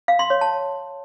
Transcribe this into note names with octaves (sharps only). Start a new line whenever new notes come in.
F5
C6
C#5
A5